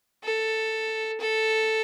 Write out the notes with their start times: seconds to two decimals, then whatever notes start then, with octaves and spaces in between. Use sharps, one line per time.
0.24 A4
1.20 A4